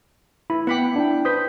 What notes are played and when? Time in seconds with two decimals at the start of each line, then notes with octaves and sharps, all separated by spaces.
0.50 E4 B5
0.67 B3 F#5 G5 B5 D6
0.96 D4 E4 G5
1.25 B4 C5 D#6 G6 B6